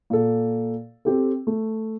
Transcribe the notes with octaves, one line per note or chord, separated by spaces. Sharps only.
A#2 A4
C4 G4 A4
A3